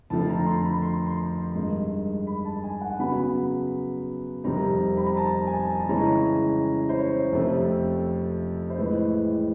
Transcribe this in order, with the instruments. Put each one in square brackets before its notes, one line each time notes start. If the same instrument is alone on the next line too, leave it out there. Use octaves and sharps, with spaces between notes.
[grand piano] F2 D3 F3 A3 A5
A#5
C6
B5
C6
C6
G2 D#3 G#3
B5
A5
G#5
F#5
C#3 F#3 B3 B5
F2 C3 D#3 G3 C4 A#5
B5
A#5
A5
G#5
A5
A5
C#3 E3 G#3 C#4 A#5
C5
C#5
F2 C3 F3 A3
C5
A2 E3 G#3 B4